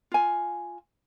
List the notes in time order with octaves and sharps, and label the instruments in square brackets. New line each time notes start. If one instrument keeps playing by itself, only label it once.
[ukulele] F4 G#5